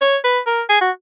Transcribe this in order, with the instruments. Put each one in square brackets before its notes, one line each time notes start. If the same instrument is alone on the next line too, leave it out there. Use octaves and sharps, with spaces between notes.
[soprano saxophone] C#5
B4
A#4
G#4
F#4